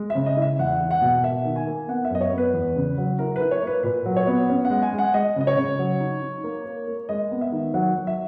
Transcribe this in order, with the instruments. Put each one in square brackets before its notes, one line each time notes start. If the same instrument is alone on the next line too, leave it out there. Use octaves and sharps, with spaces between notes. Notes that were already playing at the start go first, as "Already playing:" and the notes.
Already playing: [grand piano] G#3
E5
C#3
D#5
E4
E5
E2 F#5
E4
F#5
B2
A#3 E5
D#3
G#5
A#3
B3 F#5
E5
F#2 D#5
C#5
B3
B4
E2
C#3
F#3
E4 A#4
E4 B4
C#5
A#3 B4
A#2 B4
F#3
C#5
B3
C#4
F#5
G#3
G#5
G#3
F#5
G#3 D#5
C#3 D#5
C#5
C#3
F#3
D#4
D#4
A#3
A#3
A#3
G#3 D#5
B3
E5
D#3
F#3 F#5
F#3
E5